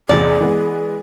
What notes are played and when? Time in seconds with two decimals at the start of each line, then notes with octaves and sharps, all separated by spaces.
0.09 A1 E2 C3 G#4 D5
0.40 E3 G#3 B3